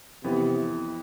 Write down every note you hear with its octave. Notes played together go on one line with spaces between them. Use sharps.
F2 C3 E3 B3